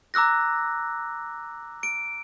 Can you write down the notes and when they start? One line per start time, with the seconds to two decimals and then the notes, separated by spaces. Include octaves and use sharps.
0.14 A#5 D6 E6 F#6 A#6
1.83 D7